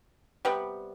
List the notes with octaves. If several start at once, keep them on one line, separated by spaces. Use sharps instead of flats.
C3 G3 B3